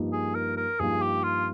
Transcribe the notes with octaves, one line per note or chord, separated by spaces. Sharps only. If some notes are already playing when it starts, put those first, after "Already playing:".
Already playing: G2 F3 A#3 D#4
G#4
A#4
A#4
G2 F3 A#3 D#4 G#4
G4
F4